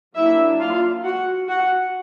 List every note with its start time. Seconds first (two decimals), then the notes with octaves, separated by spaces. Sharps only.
0.15 F#3 A#3 D4 E4 E5
0.59 F4 F5
1.04 F#4 F#5
1.49 F#4 F#5